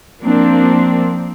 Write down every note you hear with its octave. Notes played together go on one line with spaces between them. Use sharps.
F3 A#3 C4 D4